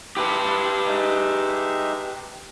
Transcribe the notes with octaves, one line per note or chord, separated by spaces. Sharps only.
E4 G4 B4 A5 C6
G#3 D#4 E5